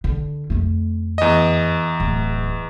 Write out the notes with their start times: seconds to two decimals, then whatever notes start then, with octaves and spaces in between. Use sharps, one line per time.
0.04 D3
0.50 F2 A3
1.18 E2 D#5
2.00 D1